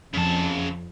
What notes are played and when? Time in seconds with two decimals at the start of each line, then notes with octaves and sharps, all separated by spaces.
0.14 F2 C#3 A5